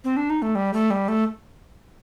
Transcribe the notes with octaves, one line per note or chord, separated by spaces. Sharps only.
C4
D4
D#4
A3
G3
A3
G3
A3